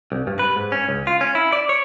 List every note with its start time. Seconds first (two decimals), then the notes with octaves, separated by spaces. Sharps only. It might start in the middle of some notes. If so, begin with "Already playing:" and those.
0.12 C2
0.27 G2
0.39 B4
0.56 G#2
0.72 C#4
0.89 C#2
1.07 F4
1.21 C#4
1.35 E4
1.53 D5
1.69 C#5